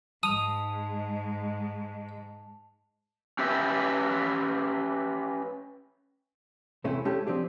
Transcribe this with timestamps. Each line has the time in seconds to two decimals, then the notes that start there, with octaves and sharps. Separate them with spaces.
0.23 G#2 G#3 A5 D#6 F7
3.39 C#4 G4 B4 E5
6.84 E2 C3 A3 C#4 E4
7.05 G#3 A3 C#4 D4 G4 A4
7.27 F3 C4 D4 G4